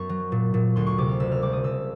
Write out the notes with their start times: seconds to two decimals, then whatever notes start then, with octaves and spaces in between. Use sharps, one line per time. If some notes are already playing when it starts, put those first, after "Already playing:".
Already playing: F#2 B3 C#6
0.09 F#3
0.32 A#2
0.54 A#2
0.76 D2 C6
0.87 C#6
0.98 C3 D6
1.09 F6
1.20 F#1 E6
1.32 F6
1.42 G3 D6
1.53 D#6
1.64 C#3 E6